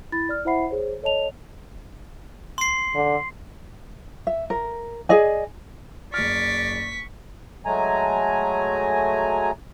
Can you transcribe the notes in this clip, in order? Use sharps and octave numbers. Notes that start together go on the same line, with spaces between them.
E4 B5 A6
D5 F6
E4 C5 E5 F#5 B5 C7
G#4 C5 C#5
A4 C#5 D#5 A5 F7
C6 C7
D3
E5
A#4
G#4 D5 D#5 G#5
F#1 D5 C#6 F6 B6
F#3 G#3 A3 G#5 A#5